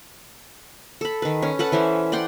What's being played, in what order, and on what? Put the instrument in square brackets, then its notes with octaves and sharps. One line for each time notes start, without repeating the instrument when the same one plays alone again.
[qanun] A4 B5
D#3 B4
C#4
A4 B4 F#5 A5
E3 C#4 C5 E5
D5 F#5 G5 C6